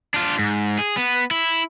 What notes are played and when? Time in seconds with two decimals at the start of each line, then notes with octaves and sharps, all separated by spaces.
0.14 D4 F4
0.39 G#2
0.78 G#4
0.97 B3
1.31 E4